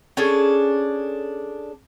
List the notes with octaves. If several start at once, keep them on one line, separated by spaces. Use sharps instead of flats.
C#4 D4 G#4 A4